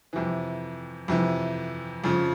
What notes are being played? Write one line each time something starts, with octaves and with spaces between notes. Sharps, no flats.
F2 C3 E3
F2 C3 E3
F2 C#3 F3